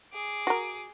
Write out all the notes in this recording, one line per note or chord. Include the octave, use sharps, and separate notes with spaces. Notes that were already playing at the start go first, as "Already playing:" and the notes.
G#4 D6
F#4 A#4